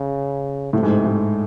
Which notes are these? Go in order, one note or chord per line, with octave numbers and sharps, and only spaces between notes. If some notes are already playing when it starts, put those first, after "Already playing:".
Already playing: C#3
A2 C3
G#2
G#2